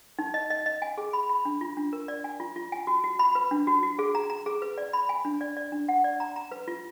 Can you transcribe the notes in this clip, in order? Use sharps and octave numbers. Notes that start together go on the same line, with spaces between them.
D#4
D#5
D#5
D#5
G#5
G#4
B5
B5
D4
F4
D4
A#4
D5
G#5
F4
F4
G#5
F#4
F#4
B5
B4
D4
F#4
F#4
G#4
A#5
A#5
G#4
B4
D5
B5
G#5
D4
D5
D5
D4
F#5
D5
A#5
A#5
B4
F4